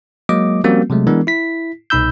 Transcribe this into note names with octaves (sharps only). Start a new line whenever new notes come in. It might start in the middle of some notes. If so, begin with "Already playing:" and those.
F#3 G#3 A#3 D#5 D6
F3 G3 A#3 C4 C#4 F#4
C3 F#3 G#3 A3
E3 G#3 B3 D4 A#4
E4 B6
C2 B2 D#4 B5 E6 G6